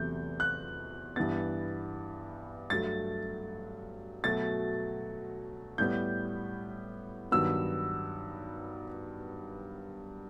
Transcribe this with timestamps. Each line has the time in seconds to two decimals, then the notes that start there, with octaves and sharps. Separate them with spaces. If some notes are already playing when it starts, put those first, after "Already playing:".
Already playing: E2 C3 F#3 A3 G6
0.40 F#6
1.16 G2 E3 B3 A6
2.70 G2 F#3 A3 A6
4.24 B2 F#3 A3 A6
5.78 A2 G3 B3 G6
7.32 G2 D#3 F#3 B3 E6